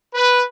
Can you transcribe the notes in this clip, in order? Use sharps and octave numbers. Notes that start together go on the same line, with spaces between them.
B4